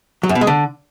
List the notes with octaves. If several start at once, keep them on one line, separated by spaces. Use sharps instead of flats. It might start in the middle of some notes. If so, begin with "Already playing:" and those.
F#3
F#2
B2
G#3
D3